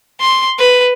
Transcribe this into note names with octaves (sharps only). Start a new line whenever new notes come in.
C6
B4